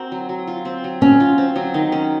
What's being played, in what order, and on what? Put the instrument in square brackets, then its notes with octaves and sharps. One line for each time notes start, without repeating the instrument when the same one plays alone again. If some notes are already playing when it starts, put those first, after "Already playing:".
Already playing: [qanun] C4 F#4 A#4
F#3
F#3
F4
C4
F#3
[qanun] F#3 [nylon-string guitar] C#4
[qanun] F4
C4
F#3
D#3
C#4